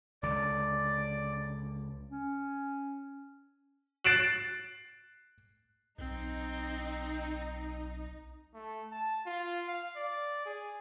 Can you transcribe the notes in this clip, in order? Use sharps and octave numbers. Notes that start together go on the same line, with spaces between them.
C#2 D3 D5
C#4
F#6 A6 C7 D7 E7 F#7
B1 C4 D#4
A3
A5
F4
F5
D5
G#4